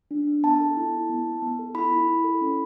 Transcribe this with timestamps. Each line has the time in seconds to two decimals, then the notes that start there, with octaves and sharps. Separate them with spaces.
0.11 D4
0.27 D4
0.43 B3 A5
0.60 A4
0.77 E4
0.92 E4
1.09 B3
1.26 B3
1.42 B3
1.59 A4
1.75 E4 B5
1.92 E4
2.08 E4
2.24 A4
2.41 C#4